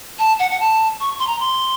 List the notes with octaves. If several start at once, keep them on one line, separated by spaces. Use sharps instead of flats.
A5
F#5
F#5
A5
C#6
C6
A#5
C6